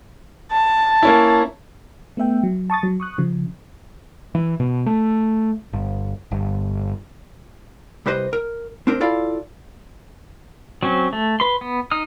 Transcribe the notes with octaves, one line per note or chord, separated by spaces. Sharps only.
A5
A#3 C#4 E4
A3 B3 E5 G5
F#3
A5 C#6 D#6 A6
F#3
C#6 D#6 F#6
C#3 F3
E3
B2
A3
G1
G1
C2 G4 B4 C5 D#5
A#4
C4 D4 A#4 C5
E4 F4 A4 D5 F5
F#3 C4 C#4
A3
B4 C6
B3
D#4 D#6 F6